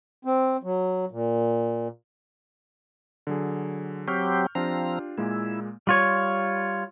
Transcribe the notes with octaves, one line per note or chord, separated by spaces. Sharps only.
C4
F#3
A#2
D3 F#3 G#4
F#3 C4 G4 C#6 F6 G6
F3 C4 D4 F4 G4 A#5
A#2 G#3 A#3 E4
G3 F4 C#5